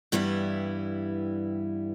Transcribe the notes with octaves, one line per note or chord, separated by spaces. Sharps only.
G2 E3 G3 B3 E4